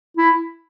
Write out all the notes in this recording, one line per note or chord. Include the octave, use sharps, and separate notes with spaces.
E4